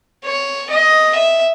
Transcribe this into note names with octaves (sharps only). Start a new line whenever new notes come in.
C#5
D#5
E5